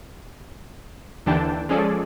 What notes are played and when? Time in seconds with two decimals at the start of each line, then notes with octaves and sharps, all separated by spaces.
1.26 D#2 D3 E3 D4 G5 A5
1.69 F3 G#3 C#4 G#4 A4 D5